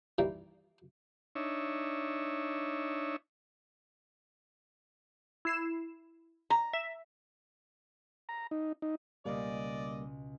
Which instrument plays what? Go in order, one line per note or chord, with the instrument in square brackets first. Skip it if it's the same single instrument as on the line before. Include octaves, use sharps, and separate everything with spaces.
[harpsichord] D#3 E3 G3 A#3
[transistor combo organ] D4 D#4 C#5 E5
[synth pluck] E4 C7 E7
[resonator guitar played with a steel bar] A#5
[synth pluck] E5
[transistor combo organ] A#5
D#4
D#4
[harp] C#2 B2 [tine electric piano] G3 A#3 [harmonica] D5 D#5